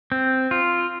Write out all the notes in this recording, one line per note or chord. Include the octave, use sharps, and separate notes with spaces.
C4
F4